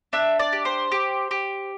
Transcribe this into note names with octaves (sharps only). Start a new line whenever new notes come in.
D4 E5
D5
G4
C5
G4
G4